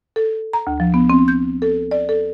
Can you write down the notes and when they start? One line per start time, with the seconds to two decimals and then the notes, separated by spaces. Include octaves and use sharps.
0.16 A4
0.53 A#5
0.67 D2
0.80 F3
0.94 B3
1.10 C4
1.28 G6
1.62 A4
1.91 D5
2.09 A4